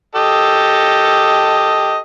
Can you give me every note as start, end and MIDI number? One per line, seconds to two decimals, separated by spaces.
0.15 1.98 67
0.15 1.98 69
0.15 1.98 75